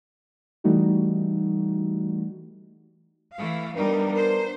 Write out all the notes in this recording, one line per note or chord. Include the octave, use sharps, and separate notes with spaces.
E3 G3 A3 D#4 F#4
E3 A3 F5
G3 B3 D4 D#4 A#4
C5